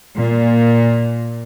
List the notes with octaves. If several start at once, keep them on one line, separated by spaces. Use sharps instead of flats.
A#2